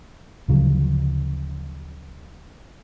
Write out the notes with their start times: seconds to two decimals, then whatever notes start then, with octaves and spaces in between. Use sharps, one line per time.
0.48 D2 C#3 F3 F#3